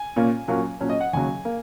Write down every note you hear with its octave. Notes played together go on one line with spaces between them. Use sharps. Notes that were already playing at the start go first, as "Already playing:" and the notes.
Already playing: G#5
A#2 A#3 C#4
A#2 F#3 A#3 C#4
A#2 F#3 C#4
D#5
F#5
D#2 C#3 F#3 G#5
A#3